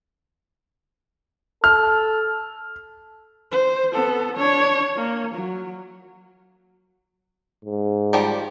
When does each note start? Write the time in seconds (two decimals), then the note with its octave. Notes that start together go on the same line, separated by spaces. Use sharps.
1.64 A4 F6
3.52 C5
3.93 B3 A4
4.37 D4 C#5
4.96 A#3
5.35 F#3
7.65 G#2
8.13 D#3 F3 G3